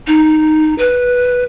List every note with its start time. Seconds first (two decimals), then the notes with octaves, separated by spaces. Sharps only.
0.07 D#4
0.78 B4